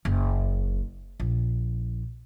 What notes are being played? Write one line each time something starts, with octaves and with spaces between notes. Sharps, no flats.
F#1
A#1